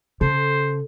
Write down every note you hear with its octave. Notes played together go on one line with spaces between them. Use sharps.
C#3 A4 C5